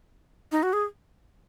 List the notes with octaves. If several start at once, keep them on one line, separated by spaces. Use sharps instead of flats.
D#4
F#4
G#4